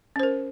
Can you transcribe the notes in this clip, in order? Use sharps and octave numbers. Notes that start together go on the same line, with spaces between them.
C#4 A#4 C5